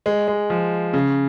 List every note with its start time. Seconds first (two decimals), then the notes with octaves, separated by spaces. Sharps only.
0.06 G#3
0.28 G#3
0.50 F3
0.94 C#3